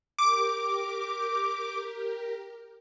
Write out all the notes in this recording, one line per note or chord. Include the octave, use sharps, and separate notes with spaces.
G4 A#4 D6